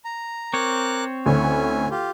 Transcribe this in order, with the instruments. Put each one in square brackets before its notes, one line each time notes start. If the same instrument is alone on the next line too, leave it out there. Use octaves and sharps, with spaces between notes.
[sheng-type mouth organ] A#5
[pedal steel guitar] C4 C#5 [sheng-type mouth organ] A#4 D6 F#6
[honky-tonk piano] D2 [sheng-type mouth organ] C#4 E4 G#5
[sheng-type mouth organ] F4 G4